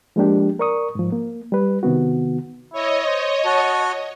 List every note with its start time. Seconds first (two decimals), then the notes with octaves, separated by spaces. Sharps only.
0.16 F3 G#3 A#3 D4 G4
0.59 A#4 D5 C#6 D#6
0.95 G#2 F3
1.12 A#3
1.52 G3 B4
1.83 C3 D#3 B3 F#4
2.73 E4 C#5 D#5
3.06 C5
3.45 F#4 A5